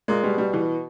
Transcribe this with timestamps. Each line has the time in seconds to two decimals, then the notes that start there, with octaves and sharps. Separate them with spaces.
0.08 A#2 G#3
0.24 B2 G3
0.38 G3
0.53 E3